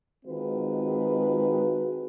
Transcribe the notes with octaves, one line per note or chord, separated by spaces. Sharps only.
D#3 G#3 C4 F4 F#4 B4